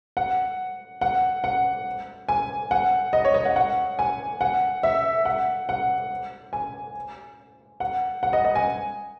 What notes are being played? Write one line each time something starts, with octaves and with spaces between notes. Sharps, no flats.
F#5
F#5
F#5
G#5
F#5
D#5
C#5
D#5
F#5
F#5
G#5
F#5
E5
F#5
F#5
G#5
F#5
F#5
D#5
D#5
G#5